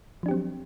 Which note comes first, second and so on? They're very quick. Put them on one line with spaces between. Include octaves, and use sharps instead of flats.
F3 D4 G4 C4 F#3